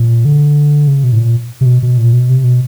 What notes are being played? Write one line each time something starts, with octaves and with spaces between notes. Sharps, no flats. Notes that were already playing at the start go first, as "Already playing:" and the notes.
Already playing: A#2
D3
C#3
B2
A2
A#2
C3
B2
B2
A#2
B2
C3
B2